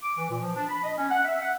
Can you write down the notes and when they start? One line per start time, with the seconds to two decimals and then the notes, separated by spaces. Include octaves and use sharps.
0.03 D6
0.18 E3
0.30 A#2
0.41 F3
0.56 D4
0.69 B5
0.84 D#5
0.98 C#4
1.11 F#5
1.25 E5
1.41 F#5